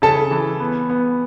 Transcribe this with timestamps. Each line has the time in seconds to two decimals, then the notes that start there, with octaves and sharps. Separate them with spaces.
0.02 C#3 A4 A5
0.31 E3
0.60 B3
0.90 B3